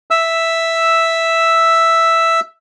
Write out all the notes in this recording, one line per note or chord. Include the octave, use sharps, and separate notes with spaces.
E5 E6